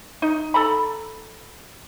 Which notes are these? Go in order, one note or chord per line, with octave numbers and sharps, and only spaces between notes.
D#4
A4 A#5 B5